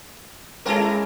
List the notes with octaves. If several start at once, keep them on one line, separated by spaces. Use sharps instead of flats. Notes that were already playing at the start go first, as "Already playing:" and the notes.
G#3 A#3 C#4 E4 A4 A#4 G5